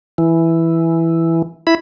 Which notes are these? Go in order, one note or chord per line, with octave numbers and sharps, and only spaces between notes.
E3
E4 B5